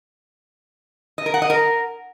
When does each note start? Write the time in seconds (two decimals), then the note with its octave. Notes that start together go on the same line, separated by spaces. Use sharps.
1.18 D#5
1.26 A#4
1.34 F#5
1.42 D#5
1.50 A#4